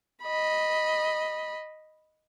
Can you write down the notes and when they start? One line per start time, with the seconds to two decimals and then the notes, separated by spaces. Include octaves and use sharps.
0.24 D#5 B5